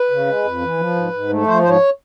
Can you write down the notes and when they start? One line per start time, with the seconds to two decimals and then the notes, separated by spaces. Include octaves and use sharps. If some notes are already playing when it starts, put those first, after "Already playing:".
Already playing: B4
0.11 C#3
0.27 G#3
0.44 F2
0.61 E3
0.78 F3
0.95 G#2
1.13 G#2
1.30 A3
1.46 F3 C5
1.62 G#2 C5
1.69 C#5